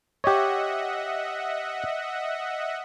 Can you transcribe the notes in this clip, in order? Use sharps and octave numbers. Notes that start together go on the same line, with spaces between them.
G4 C#5 D#5 E5 F#5